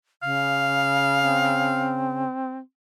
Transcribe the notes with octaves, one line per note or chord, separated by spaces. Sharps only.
C#3 F5
C4